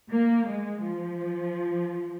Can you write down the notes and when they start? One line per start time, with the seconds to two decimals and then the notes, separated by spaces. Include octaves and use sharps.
0.11 A#3
0.47 G#3
0.83 F3